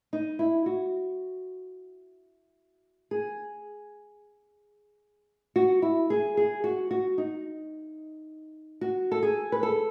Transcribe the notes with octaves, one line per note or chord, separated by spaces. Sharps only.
D#4
E4
F#4
G#4
F#4
E4
G#4
G#4
F#4
F#4
D#4
F#4
A4
G#4
B4
A4